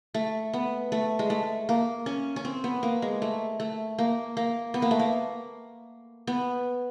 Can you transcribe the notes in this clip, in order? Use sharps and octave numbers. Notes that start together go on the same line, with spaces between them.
A3
B3
A3
G#3
A3
A#3
C#4
C#4
C4
B3
A#3
G#3
A3
A3
A#3
A#3
B3
A#3
A3
A#3
B3